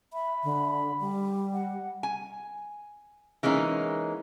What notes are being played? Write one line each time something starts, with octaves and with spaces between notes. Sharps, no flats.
E5 B5
D3
G3
F#5
G#5
E3 G#3 A#3 C#4 D#4